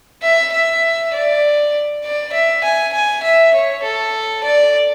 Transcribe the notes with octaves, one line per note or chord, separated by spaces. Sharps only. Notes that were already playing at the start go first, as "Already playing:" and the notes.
E5
E5
D5
D5
E5
G#5
G#5
E5
C#5
A4
D5